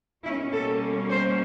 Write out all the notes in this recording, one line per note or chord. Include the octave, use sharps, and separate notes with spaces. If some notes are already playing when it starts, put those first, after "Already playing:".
B2 G3 A#3 C#4 E4
A4
C5